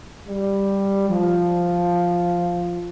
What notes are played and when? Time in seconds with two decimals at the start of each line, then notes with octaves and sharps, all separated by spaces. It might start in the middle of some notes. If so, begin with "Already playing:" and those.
0.26 G3
1.09 F3